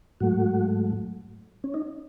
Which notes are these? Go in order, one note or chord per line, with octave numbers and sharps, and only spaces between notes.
G#2 F#3 A3 F#4
C#4
D#4